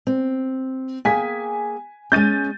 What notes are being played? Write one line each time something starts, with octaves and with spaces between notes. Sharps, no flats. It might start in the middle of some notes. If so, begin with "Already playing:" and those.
C4
A#3 G#4 G5 G#5 B6
G#3 C#4 G6 A6 D#7